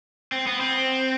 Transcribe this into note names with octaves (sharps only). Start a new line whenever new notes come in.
C4
B3
C4